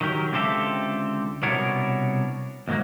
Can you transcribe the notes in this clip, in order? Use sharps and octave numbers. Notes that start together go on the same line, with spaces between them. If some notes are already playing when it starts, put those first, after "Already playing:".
D#3 F#3 G4 A#4
C#2 D3 C4 G4 A4 E5
C2 B2 B3 D4 A#4 C#5
D#2 G#2 D3 F#3 A#3